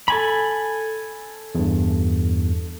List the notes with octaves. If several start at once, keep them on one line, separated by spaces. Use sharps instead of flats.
A4 G#5 B5
E2 G2